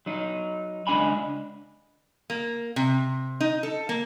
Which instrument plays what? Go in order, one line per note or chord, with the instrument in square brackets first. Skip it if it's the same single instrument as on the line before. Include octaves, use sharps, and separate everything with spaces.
[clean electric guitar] F#3 D#4
C#2 G#2 D4 D#5 G#5 B5
[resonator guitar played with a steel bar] A#3
C3
D#4
A4
A#3